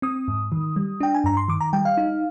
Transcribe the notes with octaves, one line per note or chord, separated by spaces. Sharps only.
C4 D#6
G#2
D#3
G3
D4 G5
G#5
G2 A#5
C6
D#3 D6
A#5
G3 G5
F5
D#4